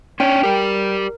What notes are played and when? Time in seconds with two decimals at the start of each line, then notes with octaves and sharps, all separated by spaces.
0.20 C#4 D4 C#5 G5
0.43 G4 A#4 D5